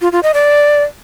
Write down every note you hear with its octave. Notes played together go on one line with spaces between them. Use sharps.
F4
F4
D#5
D5